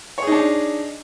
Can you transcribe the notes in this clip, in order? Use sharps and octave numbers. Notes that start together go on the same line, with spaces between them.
D4 D#4 G#4 C#5